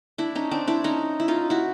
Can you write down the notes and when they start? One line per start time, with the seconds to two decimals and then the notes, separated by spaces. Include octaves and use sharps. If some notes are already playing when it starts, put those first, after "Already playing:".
0.18 D4 E4
0.35 C#4 D#4
0.51 C4 D4
0.67 D4 E4
0.84 C#4 D#4
1.20 E4
1.28 D#4 F4
1.50 E4 F#4